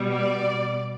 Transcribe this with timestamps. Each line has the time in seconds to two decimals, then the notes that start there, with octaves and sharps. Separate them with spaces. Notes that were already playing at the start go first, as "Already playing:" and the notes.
Already playing: B2 G3
0.12 D5